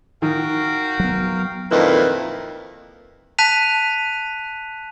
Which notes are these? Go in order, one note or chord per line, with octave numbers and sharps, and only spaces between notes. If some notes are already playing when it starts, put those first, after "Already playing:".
D#3 F#4 A#4 F5 G5
F#3 B3
F2 A#2 D#3 F3 E4 B4
A5 F#6 B6 D#7 F7